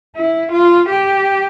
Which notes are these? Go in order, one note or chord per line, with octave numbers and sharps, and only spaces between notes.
E4
F4
G4